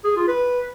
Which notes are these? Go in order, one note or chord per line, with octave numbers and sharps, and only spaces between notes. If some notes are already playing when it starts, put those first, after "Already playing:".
G#4
F4
B4